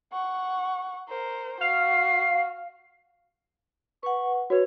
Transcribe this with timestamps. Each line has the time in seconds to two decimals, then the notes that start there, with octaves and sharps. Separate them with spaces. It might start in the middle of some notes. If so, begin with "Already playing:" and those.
0.13 F#5 C#6
1.08 A#4 C5
1.61 F#4 F5 C7
4.03 B4 F#5 C#6
4.50 F#4 B4 C#5